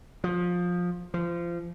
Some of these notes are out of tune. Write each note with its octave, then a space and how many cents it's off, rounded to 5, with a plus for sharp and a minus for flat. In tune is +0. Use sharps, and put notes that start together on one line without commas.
F3 +20
F3 -25